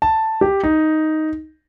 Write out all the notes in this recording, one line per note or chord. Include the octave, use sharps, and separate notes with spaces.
A5
G4
D#4